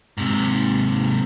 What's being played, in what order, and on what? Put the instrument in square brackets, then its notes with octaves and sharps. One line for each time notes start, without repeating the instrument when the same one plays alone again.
[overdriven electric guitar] G#2 C3